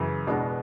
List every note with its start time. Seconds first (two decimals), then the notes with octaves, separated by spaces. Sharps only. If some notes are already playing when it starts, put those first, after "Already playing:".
Already playing: F#2 C#3 E3
0.27 E2 B2 G#3 B3 D4